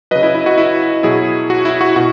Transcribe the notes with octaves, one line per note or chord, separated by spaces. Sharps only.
C#3 F#3 B4 D#5
E4
E4
F#4
E4
B2 F#3 E4 G#4
F#4
E4
F#4
B2 F#4